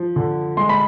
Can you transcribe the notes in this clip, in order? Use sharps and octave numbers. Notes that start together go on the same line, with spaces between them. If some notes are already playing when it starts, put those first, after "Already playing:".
Already playing: F3
D3
G#3 C6
B5